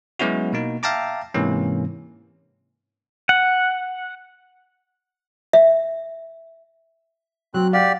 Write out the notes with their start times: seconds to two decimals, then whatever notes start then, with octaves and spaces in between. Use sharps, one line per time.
0.19 F#3 G#3 B3 C#4 E4 F#4
0.53 B2 A#3 D#4
0.83 E5 F5 G5 A5 A#5 D6
1.34 G#2 C3 E3 A#3 C#4
3.29 F#5
5.53 E5
7.54 F#3 C4 F#6
7.73 G4 D5 F5 F#5